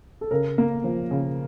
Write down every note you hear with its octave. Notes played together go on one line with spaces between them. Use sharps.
A4
C#3 A#4
A#3
F3
C#3